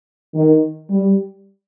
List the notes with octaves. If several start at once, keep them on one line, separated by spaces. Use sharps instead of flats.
D#3
G3